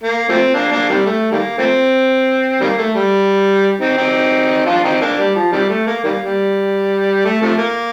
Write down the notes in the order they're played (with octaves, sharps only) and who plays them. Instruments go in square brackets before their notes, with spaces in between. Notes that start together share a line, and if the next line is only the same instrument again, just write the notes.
[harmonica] A#3
F3 A3 C4
A#3 D4
A#3 D4
C3 D#3 G3
A3
D#3 G3 A#3
F3 A3 C4
D#3 G3 A#3
A3
G3
C4 D#4
C4 D#4
D4 F4
C4 D#4
A#3 D4
G3
F3
C3 D#3 G3
A3
A#3
D#3 G3 A#3
G3
A3
C3 F3 A3
A#3